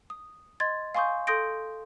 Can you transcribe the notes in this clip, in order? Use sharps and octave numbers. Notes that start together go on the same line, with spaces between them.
D#6
D#5 C6 G#6 A6
F5 G#5 C6 C#6 D#6 G6
A4 C6 D#6 G6 A#6 D7